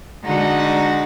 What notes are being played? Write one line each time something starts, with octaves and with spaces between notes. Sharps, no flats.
D3 G#3 D#4 F#4